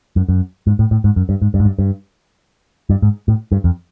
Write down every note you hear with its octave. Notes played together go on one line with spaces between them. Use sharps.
F#2
F#2
G#2
A2
A2
G#2
F#2
G2
G#2
G2
G#2
G2
G2
G2
G#2
A2
G2
F2